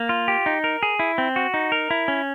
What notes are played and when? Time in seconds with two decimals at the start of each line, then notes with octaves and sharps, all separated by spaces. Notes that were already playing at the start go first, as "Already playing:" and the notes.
Already playing: A#3
0.09 F4
0.28 G4
0.46 D#4
0.64 A#4
0.83 G#4
0.99 E4
1.18 C4
1.36 F#4
1.54 D#4
1.72 A#4
1.90 E4
2.08 C#4